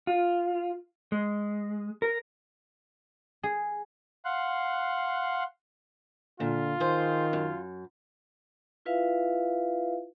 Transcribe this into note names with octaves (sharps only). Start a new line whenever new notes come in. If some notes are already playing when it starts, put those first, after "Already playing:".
F4
G#3
A#4
G#4
F5 F#5 C6 F#6
A#2 D3 F4
D#3 G#4 C5
F#2
E4 F4 B4 E5 F5